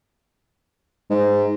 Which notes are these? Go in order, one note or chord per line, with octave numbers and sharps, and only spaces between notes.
G#2